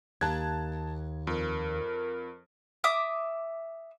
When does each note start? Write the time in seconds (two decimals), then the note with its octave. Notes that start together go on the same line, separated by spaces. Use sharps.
0.21 D#2 A5 F#6 G#6
1.27 F2 A#4
2.84 E5 D6 D#6